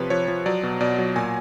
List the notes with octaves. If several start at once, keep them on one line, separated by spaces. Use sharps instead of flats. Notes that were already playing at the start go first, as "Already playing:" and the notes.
Already playing: C3 F3 B4 C#5
F3 C#5
F3
F#3 D5
B2
B2 D5
F#3
A#2 G#5